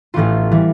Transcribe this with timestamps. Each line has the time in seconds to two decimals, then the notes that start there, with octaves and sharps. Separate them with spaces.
0.14 A1 A2 E3 B3 F4
0.51 E3 G3